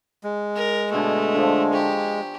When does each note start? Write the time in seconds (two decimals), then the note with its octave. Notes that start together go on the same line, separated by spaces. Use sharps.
0.24 G#3
0.56 A#4
0.92 B2 D3 A3 G#5
1.34 D3 F3
1.73 G4 A#5 C#6